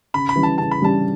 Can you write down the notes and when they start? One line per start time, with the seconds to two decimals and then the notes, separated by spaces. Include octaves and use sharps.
0.14 C#3 B5
0.29 B5
0.36 E3 G3 C#4
0.43 A5
0.58 C#3 A5
0.71 B5
0.81 E3 G3 C#4 A5